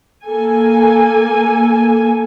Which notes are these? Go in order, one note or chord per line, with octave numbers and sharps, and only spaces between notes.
A#3 A4 G#5